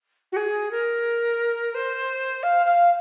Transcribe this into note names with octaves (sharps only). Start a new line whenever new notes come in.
F#4
G#4
A#4
C5
F5
F5